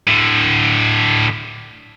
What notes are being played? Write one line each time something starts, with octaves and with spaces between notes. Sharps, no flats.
A2 D3